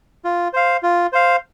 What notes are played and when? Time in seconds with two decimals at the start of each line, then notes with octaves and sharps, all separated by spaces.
0.24 F4
0.53 C5 F5
0.83 F4
1.13 C5 F5